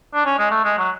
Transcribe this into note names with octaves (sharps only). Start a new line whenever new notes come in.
D4
C#4
G#3
A3
G#3
F#3